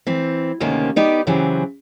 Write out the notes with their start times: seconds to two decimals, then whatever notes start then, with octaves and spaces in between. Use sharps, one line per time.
0.07 E3 C4
0.60 D2 C3 D#3 A#3 C#4
0.96 B3 D#4 G4 D5
1.27 C#3 E3 F#3 C4 G4 G#4